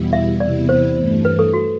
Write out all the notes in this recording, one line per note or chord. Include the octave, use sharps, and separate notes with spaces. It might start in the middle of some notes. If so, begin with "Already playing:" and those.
Already playing: E2 B2 G3 B3 E4
E5
E2 C3 E3 B3 E4 D5
C5
G2 E3 A3
B4
A4
F#4